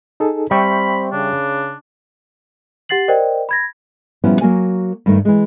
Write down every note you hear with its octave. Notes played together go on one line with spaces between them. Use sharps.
D#4 G#4 A4
G3 C4 E5 G5 B5 C#6
C#3 D4
G4 F#5 A6 C7 F#7
A#4 C5 D5 D#5 G5
B5 G#6 A#6
A#2 F3 G3 B3 C#4 E4
F#3 A#3 F#4 A#4 G#5
G2 D#3 A3
E3 G#3